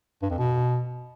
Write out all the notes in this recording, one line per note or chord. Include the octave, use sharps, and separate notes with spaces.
G2
F2
B2